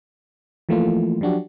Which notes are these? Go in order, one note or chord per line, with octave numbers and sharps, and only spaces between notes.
E3 F3 A3 A#3 E4 F4
F3 F#3 D4 F#4 G4